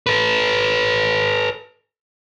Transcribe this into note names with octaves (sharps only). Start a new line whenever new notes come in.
A4 B4